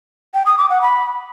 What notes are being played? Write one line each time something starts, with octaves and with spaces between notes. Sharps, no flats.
G5
D#6
D6
F#5
B5